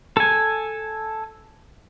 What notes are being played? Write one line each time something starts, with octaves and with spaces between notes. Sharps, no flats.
A4 G#5